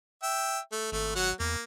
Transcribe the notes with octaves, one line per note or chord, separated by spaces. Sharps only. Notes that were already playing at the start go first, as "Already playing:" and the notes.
E5 G5
A3
G#1 A3
F#3 F#5
E2 A#3